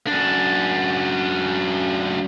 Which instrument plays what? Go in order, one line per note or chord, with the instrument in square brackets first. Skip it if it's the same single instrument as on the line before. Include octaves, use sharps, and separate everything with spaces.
[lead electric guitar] F#2 D4